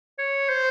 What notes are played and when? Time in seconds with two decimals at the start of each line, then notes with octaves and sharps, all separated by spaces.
0.19 C#5
0.49 C5